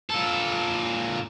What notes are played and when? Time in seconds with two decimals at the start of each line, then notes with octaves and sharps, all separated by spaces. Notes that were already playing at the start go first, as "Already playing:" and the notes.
0.10 A#2 A4